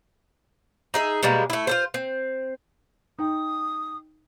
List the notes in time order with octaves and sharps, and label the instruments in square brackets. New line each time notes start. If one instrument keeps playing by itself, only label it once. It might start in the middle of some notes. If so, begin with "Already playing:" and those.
[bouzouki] D#4 G#4 E5
B2 G3 G#3 A#3
A3 E4
F4 A4 C5
C4
[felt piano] D#4 G5 [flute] D#6